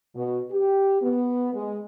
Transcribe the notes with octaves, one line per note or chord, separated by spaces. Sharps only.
B2
G4
B3
G#3